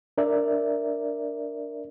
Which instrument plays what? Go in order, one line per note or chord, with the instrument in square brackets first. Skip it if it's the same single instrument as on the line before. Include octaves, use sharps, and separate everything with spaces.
[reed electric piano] D4 A#4 D5 E5